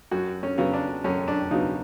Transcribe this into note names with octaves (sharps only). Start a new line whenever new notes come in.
F#2 F#4
C#4
C#3 F#3 B3
D4
F#2 C#4
D4
C#3 F#3 B3 D#4